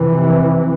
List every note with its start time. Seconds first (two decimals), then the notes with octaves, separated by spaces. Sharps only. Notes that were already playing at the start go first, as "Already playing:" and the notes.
Already playing: F2 C3 E3